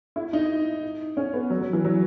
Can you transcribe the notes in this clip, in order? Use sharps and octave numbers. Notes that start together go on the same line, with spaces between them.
E4
D#4
C#4
B3
F#3
F#3
E3
F#3